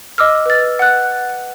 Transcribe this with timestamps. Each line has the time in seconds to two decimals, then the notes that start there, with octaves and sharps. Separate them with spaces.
0.18 D#5 D6 E6 F6
0.46 B4 A6
0.79 F#5 F#6